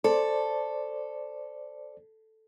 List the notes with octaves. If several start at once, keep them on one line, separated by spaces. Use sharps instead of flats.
A4 C5 D5